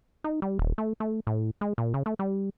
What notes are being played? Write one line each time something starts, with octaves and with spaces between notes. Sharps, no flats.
D#4
G3
D#1
A3
A3
A2
G#3
A#2
C#3
A3
G3